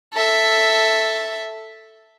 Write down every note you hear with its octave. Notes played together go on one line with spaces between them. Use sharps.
A4 E5